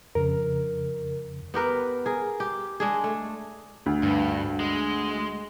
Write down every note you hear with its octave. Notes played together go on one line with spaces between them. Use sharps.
F2 C#3 A#4
B3 G4 A#4 B4
G#4 A#4
G4
G#3 D4 G#4
A3
D2
G2
G#3